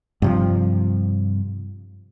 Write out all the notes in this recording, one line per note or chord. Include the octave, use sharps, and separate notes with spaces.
G2 C3 F3